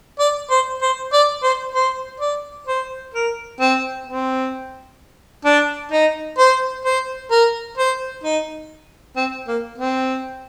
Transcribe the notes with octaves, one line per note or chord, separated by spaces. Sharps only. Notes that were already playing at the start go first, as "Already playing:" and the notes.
D5
C5
C5
D5
C5
C5
D5
C5
A#4
C4
C4
D4
D#4
C5
C5
A#4
C5
D#4
C4
A#3
C4